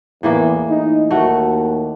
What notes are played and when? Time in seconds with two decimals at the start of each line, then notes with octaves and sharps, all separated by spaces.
0.23 E2 A2 E3 A#3
0.69 D#4
1.11 D#2 A3 F#4